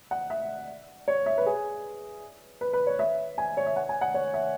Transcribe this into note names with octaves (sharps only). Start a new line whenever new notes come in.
F#5
E5
C#5
E5
B4
G#4
B4
B4
C#5
E5
G#5
C#5
E5
F#5
G#5
F#5
C#5
E5